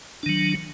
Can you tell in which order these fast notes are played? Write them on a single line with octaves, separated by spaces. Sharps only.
D4 D#3 F#3